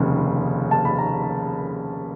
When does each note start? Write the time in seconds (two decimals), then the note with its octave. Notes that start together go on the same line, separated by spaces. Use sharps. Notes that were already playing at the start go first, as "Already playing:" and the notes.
Already playing: F1 D#2 C#3
0.71 A5
0.85 B5
0.99 A#5